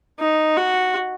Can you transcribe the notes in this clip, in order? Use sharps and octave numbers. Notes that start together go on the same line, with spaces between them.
D#4
F#4